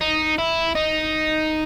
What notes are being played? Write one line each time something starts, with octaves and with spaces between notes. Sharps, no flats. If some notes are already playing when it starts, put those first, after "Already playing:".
D#4
E4
D#4